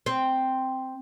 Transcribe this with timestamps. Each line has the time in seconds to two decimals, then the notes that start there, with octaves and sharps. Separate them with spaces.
0.06 C4